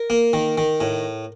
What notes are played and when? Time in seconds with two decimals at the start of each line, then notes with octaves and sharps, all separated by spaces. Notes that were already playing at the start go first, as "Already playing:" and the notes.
Already playing: A#4
0.10 A#3
0.33 D#3
0.58 D#3
0.81 A2